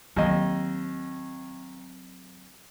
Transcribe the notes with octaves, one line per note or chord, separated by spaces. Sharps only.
D#2 F#3 C4 D#5